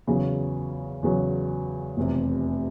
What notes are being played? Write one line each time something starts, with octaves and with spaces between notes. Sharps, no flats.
E2 C#3 F#3
E2 C#3 F#3
F1 E2 C3